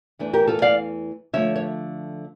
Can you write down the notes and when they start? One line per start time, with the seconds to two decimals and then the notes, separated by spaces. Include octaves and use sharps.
0.19 E2 E3 A3 D4
0.33 G4 A#4
0.47 F4 A4
0.62 D5 F5
1.33 D3 F3 A3 C#5 E5
1.56 C#5